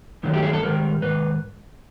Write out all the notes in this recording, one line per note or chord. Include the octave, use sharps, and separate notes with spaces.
G2 D#3 F#3 A3
G4
G#4
A4
G#2 D#3 G3 A#4
G#2 D#3 B4